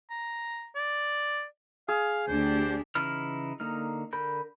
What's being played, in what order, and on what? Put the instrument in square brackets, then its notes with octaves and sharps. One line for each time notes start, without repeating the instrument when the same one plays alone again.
[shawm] A#5
D5
[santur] G#4 [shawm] F5
[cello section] D2 D4 G4 [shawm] C5
[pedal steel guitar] C#3 E3 D#4 E4 F6
D3 A#3 D#4 F6
D3 A#4 B5 G6